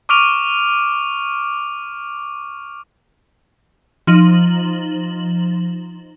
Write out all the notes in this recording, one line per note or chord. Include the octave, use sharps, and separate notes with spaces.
C#6 D6 F6 D7 D#7 F7
F3 D#4 F#7